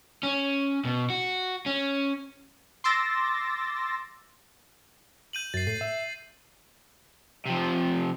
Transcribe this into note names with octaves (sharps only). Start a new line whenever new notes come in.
C#4
B2
F#4
C#4
C6 D6 E6 A6 A#6
G6 D#7 F#7
F#2 A6 C7
A2 C7
E5
C3 F3